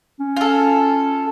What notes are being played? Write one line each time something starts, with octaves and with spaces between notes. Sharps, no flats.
C#4
F4 A4